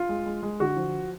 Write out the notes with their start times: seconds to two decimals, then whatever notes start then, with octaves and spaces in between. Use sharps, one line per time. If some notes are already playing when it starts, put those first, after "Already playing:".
Already playing: F4
0.09 G#3
0.26 G#3
0.43 G#3
0.60 D3 F#4
0.76 F3